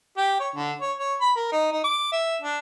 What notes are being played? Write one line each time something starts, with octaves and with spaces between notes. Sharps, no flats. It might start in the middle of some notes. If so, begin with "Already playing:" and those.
G4
C#5
D3
C#5
C#5
B5
A#4
D#4
D#4
D6
E5
D4